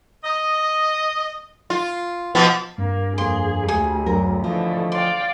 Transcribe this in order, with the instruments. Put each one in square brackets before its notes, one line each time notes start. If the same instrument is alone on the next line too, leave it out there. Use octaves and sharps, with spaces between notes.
[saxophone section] D#5
[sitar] F4
B2 F3 B3
[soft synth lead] G2 [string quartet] A#3
[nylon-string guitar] F2 A#3 [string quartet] G#4 [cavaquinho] C6
[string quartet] D2 [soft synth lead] G4 [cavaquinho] G#4
[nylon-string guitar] F#2 A#4 [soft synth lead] F#3
[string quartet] D3 E3 A3 [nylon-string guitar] F3 [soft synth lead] D#5
[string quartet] D5 F5 G5 [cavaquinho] C6